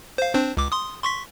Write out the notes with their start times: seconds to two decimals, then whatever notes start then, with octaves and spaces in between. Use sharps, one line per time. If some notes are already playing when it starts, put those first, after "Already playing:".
0.18 C5 F5
0.34 C4 D4 C5
0.57 C#2 D6
0.72 C6 D#6
1.03 C6 C#6 B6